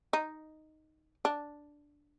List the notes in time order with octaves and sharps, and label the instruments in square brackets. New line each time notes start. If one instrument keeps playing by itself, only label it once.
[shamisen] D#4
D4